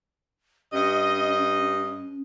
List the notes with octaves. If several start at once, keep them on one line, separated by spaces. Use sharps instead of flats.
G2 C#4 D#5